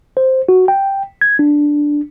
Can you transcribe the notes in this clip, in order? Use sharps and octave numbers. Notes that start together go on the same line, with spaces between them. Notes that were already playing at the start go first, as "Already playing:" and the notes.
C5
F#4
G5
G#6
D4